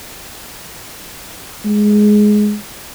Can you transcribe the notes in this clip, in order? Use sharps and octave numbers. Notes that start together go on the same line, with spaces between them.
G#3